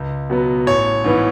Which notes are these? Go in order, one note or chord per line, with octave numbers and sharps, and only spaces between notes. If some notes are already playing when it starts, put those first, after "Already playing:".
Already playing: C#2
B2 F#3 B3
A1 C#5
G#2 E3 B3